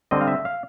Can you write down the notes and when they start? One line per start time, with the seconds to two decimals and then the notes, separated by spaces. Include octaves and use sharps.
0.11 D3 G3 C4 D#5
0.21 F5
0.28 E5
0.45 F5